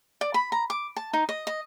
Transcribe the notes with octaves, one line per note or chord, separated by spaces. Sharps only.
D5
B5
A#5
D6
A5
D#4
D#5
D#5